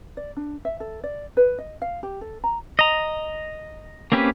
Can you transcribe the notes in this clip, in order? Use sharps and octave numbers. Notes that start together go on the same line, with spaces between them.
D5
D4
E5
A4
D5
B4
D#5
F5
G4
A4
A#5
D#5 A#5
A#3 C4 C#4 G4 B4